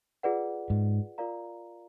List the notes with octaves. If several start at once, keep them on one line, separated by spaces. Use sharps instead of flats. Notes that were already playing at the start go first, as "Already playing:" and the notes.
F4 G#4 B4 D5 F#5
G#2
F4 A#4 D5 F5 A#5